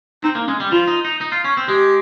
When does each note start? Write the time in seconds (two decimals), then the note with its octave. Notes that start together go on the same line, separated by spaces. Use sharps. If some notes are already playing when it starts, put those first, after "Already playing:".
0.24 C4 D#4
0.35 A#3
0.47 G#3 C#4
0.60 G3
0.72 F3 F4
0.87 D#4
1.05 D#4
1.21 D#4
1.32 F4
1.44 C#4
1.57 C4
1.68 G#3 G4